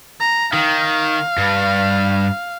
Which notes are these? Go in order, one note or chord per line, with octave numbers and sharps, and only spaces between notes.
A#5
D#3 F5
G2